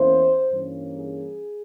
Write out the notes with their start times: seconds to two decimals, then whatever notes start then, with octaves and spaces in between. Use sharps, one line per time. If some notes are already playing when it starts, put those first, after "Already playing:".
Already playing: E2 E3 A#3 C#4 E4 C5
0.50 G2 E3 A#3 C#4
0.98 G#4